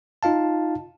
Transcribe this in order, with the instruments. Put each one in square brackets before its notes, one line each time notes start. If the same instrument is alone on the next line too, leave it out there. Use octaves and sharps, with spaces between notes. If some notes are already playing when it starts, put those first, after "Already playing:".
[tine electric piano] D#4 F4 F5 A5